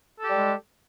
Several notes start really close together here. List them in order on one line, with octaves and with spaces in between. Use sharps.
A4 G4 G3 G#3